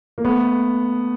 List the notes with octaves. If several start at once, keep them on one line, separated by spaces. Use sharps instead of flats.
A#3
A3 B3